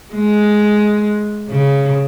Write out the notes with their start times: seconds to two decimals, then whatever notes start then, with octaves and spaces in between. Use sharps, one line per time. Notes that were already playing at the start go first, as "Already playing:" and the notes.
0.14 G#3
1.49 C#3